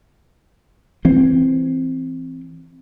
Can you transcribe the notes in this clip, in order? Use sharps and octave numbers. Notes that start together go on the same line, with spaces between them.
E3 C4